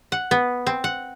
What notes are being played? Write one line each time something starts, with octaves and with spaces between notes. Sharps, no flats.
F#5
B3
C4
F#5